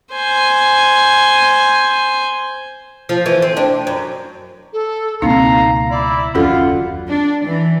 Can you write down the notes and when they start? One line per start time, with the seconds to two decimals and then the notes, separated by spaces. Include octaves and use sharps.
0.13 C5 G#5
3.09 F3
3.26 E3
3.42 C4
3.57 D4
3.87 F#2
4.73 A4
5.22 C#2 B2 G3 A#3 C4 D#4 F5 A#5
5.91 E4 D5
6.35 F#1 D#2 F#3 C#4 F4 F#4 A4 F#5
7.08 D4
7.46 E3